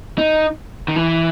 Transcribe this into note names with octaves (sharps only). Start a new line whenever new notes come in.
D#4
D#3
E3